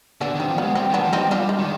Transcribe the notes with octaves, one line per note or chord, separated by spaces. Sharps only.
D3 B3 D4
D#3
C4
F3
G#3 B3
G3 C4
D#3 B3 D4
F3
G3 C4 D#4
G3 D4 F4
G#3
D#3